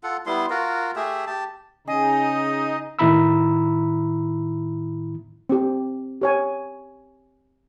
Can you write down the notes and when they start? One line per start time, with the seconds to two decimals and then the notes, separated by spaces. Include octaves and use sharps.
0.03 F4 A4 F#5
0.26 G3 B3 E4 C6
0.50 F4 F#4 A#4
0.96 A3 G4 G#4 E5
1.27 G4 A5
1.88 C#3 D#4 G#4 D#5
2.99 A2 D#3 E4 A#5 B5 E6
5.49 C4 G4
6.21 G4 C#5 G#5